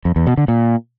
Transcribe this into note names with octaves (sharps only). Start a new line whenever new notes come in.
F2
E2
B2
D3
A#2